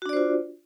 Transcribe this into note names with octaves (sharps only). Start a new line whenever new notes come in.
D4 F4 F#4 C5 D5